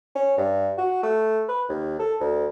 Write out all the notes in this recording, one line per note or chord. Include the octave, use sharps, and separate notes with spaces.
C#4
G2
F#4
A3
B4
D#2
A4
D2